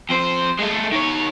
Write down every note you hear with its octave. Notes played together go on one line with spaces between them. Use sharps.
F2 C5
G#3 A3
D#3 C#5